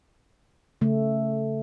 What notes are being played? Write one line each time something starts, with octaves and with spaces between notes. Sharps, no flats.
C#3 A3